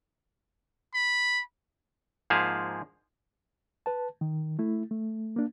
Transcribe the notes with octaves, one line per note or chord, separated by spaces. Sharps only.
B5
G#2 F3 A#3 G#4 E5 F5
B4 A5
D#3
A3 E4
A3
A#3 D4